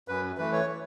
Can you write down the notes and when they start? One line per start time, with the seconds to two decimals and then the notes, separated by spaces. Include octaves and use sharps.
0.08 F#2 B4
0.38 E3 A3 B4
0.53 C#5